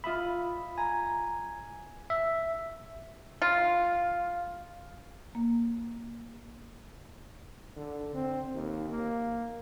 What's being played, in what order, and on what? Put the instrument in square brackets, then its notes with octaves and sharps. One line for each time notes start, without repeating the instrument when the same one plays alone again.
[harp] F4 D#5 E5 [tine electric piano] B5
[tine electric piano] G#5 [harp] A#5
[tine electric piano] E5
[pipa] F4
[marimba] A#3
[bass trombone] D3
C4
D#2
A#3